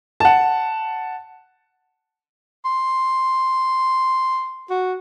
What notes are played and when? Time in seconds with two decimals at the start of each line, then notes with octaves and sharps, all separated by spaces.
0.20 F#5 A5
2.65 C6
4.70 F#4